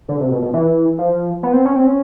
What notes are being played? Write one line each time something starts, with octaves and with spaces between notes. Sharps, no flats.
D3
C3
B2
B2
E3
F3
B3
C4
C#4
C4
C#4